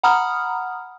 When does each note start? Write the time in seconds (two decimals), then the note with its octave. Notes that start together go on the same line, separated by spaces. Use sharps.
0.03 F#5 A#5 B5 D#6 F6